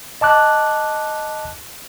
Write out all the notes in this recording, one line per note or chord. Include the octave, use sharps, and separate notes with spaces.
D#5 A5 D6 F#6